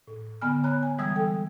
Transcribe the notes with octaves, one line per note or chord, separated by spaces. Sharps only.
A2
D3 B3 G#5 F6
C#5 A#5 B5 F#6
G#5
E3 G3 G#3 D#6 E6 G#6
A4 G5